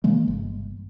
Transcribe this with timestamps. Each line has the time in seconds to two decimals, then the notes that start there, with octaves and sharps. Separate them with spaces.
0.04 C3 E3 G#3 A#3
0.28 G1